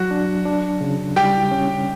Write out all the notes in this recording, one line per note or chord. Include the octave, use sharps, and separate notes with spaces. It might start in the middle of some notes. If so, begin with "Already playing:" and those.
Already playing: F#3 F#4
D4
D4
C#3
G3 G4 G5
C#4